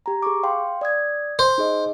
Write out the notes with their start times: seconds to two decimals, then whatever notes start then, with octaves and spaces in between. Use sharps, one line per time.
0.06 G4 A#5
0.22 G#4 C#6 D6
0.43 F5 G5 C6
0.81 D5 D#6 G#6
1.39 C5
1.58 D#4 G#4 D#5